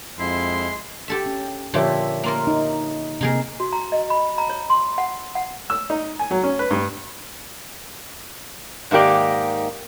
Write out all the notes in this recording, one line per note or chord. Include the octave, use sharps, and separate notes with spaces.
F2 G#3 E4 C6
G4 A4 E5
C#4
A#2 D3 F3 G4 C#5 E5
A#3 F4 A#4
D#4
C3 A#3 D#4 G#4 A#4
F#4
A#5
D#5
B5
A#5
C#5
C6
F#5
F#5
E6
D#4
G#5
F#3
C#4
B4
G2
G#2 D#3 A#3 G4 D5